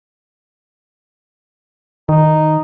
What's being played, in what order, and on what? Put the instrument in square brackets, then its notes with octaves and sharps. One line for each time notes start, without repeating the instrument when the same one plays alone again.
[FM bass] D#3 [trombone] D#4